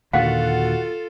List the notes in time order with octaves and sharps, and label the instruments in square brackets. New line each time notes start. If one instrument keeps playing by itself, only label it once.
[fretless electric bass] D#2 A#2 D3 [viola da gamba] F4 A4 [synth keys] F#4 F#5 [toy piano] F5